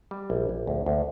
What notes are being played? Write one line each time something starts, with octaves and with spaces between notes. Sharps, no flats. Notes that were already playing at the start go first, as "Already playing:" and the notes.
G3
A#1
A#1
D2
D2